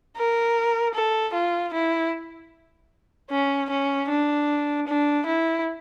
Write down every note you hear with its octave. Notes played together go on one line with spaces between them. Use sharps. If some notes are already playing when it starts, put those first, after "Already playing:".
A#4
A4
F4
E4
C#4
C#4
D4
D4
E4